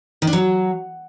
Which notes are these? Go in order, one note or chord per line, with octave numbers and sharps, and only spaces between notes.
D#3
D4
F#3